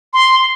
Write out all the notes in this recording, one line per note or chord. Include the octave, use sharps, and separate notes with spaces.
C6